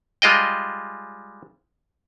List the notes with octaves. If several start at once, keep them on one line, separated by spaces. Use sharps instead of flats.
G3 G#3 F4 D#5 G5